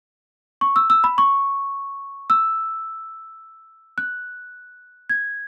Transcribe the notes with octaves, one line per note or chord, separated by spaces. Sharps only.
C#6
E6
E6
B5
C#6
E6
F#6
G#6